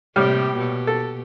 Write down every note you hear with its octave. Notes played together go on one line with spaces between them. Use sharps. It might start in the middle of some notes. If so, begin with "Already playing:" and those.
A2 C3 G3 A#3 G4 F6
B2 G4
A4